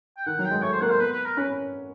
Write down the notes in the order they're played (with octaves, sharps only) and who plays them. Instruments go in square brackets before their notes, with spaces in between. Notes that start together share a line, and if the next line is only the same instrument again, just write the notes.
[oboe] G5
[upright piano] D#3 [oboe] F#5
[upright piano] F#3
[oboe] G5
[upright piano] G#3
[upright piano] A3 [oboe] C#5
[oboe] C5
[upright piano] A#3 [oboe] F#5
[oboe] C5
[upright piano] B3 [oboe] B4
[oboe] B4
A#4
[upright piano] C#4 [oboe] B4